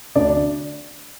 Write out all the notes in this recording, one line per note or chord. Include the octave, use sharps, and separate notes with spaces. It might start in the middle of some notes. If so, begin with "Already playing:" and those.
D2 D4 D5